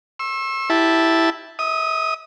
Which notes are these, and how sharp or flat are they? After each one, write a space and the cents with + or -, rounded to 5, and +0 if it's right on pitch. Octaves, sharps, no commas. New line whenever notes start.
C#6 -45 E6 +0
E4 +0 G4 +0 A5 -5
E5 -35 D#6 +0